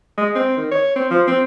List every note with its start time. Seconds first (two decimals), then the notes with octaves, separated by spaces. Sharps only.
0.17 G#3
0.35 C4
0.57 D#3
0.71 C#5
0.95 C4
1.10 F3
1.27 C4